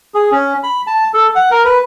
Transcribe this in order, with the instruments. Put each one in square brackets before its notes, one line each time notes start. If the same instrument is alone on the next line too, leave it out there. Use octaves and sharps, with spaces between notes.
[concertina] G#4
C#4
B5
A5
A4
F#5
A#4
B4